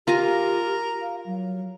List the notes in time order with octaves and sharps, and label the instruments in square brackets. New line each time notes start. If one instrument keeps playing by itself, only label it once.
[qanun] F4 G#5 A#5 [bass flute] G4 [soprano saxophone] A#4
[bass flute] F5
F#3